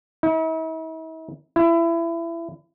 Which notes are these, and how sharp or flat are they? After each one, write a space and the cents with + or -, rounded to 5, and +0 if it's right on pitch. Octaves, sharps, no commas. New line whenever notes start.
E4 -45
E4 +25